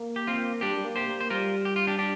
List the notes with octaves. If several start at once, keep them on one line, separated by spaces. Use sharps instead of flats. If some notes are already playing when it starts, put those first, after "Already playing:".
Already playing: A#3
G4
C4 F4
G3 D4 G4
G3
A#3
G4 C5
A#3
C5
G3 F4 A#4
G4
F4
D4 G4
D4 G4